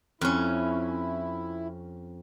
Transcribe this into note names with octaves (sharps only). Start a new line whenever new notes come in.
F2 C#4 E4